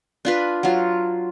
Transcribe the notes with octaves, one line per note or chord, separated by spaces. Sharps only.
D4 F4 B4
F#3 F4